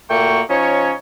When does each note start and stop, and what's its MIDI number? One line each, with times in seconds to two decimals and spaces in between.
0.10 0.41 46
0.10 0.41 57
0.10 0.41 58
0.10 0.41 66
0.10 0.41 79
0.10 0.41 85
0.50 0.92 53
0.50 0.92 61
0.50 0.92 63
0.50 0.92 73